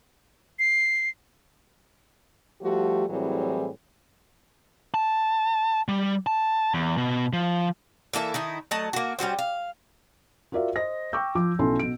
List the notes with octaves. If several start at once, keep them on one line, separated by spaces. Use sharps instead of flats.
C7
F3 G3 A3 F#4 G4
A2 E3 F#3 G3 C4 G#4
A5
G3
A5
E2
B2
F3
E3 A#3 A4 E5
D#3 D#4 E4
F#3 A3 D#5 A5
A#3 F#4
G3 C#4 F#4 C5
F5
F4 F#4 A#4 D5 E5 F5
C5 D#5 A#6
G5 C#6 D6 E6 G6
F3 D6
B1 C#4 E4 A4 C6
B2 D7